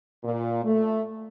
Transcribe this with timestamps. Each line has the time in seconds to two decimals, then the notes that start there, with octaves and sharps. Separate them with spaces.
0.24 A#2
0.65 A3